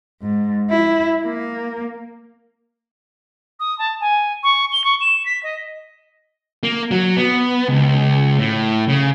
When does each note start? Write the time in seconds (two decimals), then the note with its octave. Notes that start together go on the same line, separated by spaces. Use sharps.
0.22 G#2
0.70 E4
1.24 A#3
3.60 D#6
3.79 A5
4.01 G#5
4.43 C#6
4.73 G7
4.84 C#6
5.01 E7
5.26 B6
5.43 D#5
6.63 A#3
6.91 F#3
7.17 B3
7.69 C#2
8.39 A2
8.88 C#3